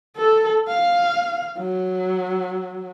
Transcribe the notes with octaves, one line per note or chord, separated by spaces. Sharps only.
A4
F5
F#3